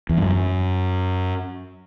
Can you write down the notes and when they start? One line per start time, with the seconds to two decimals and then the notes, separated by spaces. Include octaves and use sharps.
0.09 E2
0.17 G2
0.25 F#2